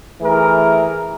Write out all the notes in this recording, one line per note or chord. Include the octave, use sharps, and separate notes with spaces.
E3 A3 G#4 A#4